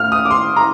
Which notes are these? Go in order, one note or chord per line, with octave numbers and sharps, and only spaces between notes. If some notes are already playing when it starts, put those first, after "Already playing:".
Already playing: A2 F6
D#6
D6
C6
A#5